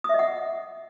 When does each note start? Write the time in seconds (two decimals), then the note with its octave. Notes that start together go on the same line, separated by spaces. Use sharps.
0.04 D#6
0.09 E5
0.14 D#5
0.19 F#5